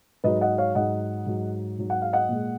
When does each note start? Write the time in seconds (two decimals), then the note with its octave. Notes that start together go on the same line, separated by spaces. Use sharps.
0.24 G#2 F#3 B4 D#5
0.41 D#5 F#5
0.58 C#5 F5
0.75 G#2 F#3 D#5 F#5
1.27 G#2 F#3
1.78 G#2 F#3
1.90 F#5
2.02 F5
2.13 D#5 F#5
2.29 A#2 G#3